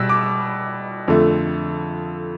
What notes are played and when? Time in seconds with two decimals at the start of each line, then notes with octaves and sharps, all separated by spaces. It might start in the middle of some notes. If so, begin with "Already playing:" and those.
Already playing: B2 G3 E6
0.09 D6
1.08 F2 D3 A3